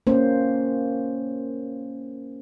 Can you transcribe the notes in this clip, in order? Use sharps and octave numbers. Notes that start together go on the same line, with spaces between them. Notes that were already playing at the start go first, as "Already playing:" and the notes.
A#3 C#4 C5